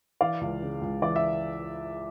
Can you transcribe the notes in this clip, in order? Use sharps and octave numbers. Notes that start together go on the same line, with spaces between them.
E3 D5 F5
C#2
C#3
C#2
E3 D5
E5